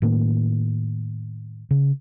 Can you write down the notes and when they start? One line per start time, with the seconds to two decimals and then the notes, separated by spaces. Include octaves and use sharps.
0.02 A2 D#3 A#3
1.71 C#3